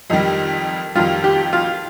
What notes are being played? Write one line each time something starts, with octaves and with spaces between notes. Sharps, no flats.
F2 D#3 G3 D#4
F2 D#3 G3 F4
G4
F4